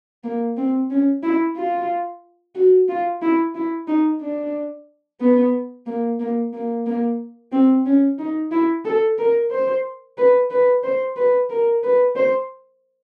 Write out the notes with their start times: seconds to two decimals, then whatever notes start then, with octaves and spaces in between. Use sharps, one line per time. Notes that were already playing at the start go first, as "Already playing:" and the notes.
0.24 A#3
0.57 C4
0.90 C#4
1.23 E4
1.56 F4
2.55 F#4
2.89 F4
3.22 E4
3.55 E4
3.88 D#4
4.21 D4
5.21 B3
5.86 A#3
6.20 A#3
6.53 A#3
6.86 A#3
7.52 C4
7.86 C#4
8.19 D#4
8.52 E4
8.85 A4
9.18 A#4
9.51 C5
10.18 B4
10.51 B4
10.84 C5
11.16 B4
11.50 A#4
11.83 B4
12.16 C5